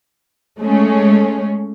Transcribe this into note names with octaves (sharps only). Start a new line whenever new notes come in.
G#3 A3 C#4